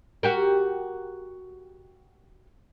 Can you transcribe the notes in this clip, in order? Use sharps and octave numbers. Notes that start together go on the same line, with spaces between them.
F#4 G4 A#4